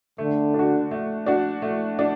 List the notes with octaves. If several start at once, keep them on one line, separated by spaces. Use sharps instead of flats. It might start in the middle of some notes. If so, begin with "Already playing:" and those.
D3 A3
D4 F#4
A3
D4 F#4
A3
D4